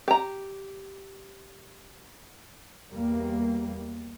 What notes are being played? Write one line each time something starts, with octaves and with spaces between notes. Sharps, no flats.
G4 A#5
E2 G3 A#3